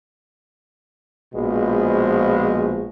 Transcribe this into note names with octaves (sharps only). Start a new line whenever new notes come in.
A#1 B2 F3 G#3